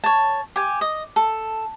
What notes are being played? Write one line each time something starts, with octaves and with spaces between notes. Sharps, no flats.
C#5 A5
G4 G#5
D#5
A4